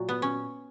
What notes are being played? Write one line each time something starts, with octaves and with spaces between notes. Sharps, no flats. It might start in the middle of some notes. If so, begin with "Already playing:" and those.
Already playing: A#2 F#3
B3
C#4